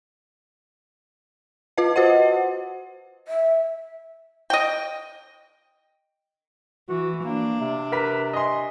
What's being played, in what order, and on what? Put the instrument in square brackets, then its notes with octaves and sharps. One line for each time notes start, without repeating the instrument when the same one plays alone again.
[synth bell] F4 B4 D#5
F#4 C5 D#5 F#5
[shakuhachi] E5
[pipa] D#5 G5
[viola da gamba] E3 [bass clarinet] F#4
[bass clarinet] A#3 [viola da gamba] D4
[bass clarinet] C3
[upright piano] A#4 B4 B6
D#5 G#5 C6